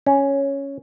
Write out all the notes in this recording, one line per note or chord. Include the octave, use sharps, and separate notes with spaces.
C#4